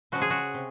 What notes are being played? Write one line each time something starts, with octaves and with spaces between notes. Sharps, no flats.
C#3 F3 G#3 F#4
G#4
F#4
C3